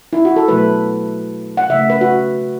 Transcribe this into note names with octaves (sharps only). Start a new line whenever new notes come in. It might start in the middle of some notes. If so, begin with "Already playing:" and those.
E4
F#4
A4
B2 F#3 A3 B4
F#5
C#3 A3 E5
B4
F#4